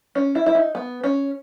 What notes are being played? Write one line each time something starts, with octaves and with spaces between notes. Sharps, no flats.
C#4
E4
E4
D#4
B3
C#4